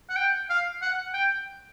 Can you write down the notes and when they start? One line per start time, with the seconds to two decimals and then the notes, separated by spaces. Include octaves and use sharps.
0.09 F#5
0.16 G5
0.50 F5
0.82 F#5
1.14 G5